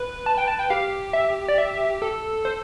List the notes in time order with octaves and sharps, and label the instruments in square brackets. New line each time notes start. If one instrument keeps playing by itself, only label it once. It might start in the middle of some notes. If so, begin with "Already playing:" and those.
Already playing: [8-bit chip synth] B4
[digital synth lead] A5
G5
A5
G5
[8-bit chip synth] G4 [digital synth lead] F5
[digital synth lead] E5
D5
E5
[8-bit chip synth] A4
[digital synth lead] C5